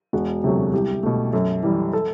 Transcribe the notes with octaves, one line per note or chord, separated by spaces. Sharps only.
E1 F#4
D2 C3 F#3 A3
C2 G4
B2 A3
F#2 A4
E3 G3
A4